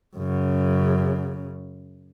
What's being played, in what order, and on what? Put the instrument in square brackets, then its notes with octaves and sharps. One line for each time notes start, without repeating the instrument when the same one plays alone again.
[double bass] F#2 C#3